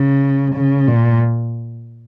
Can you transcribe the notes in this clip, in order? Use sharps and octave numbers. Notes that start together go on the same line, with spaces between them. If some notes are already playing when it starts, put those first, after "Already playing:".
Already playing: C#3
C#3
A#2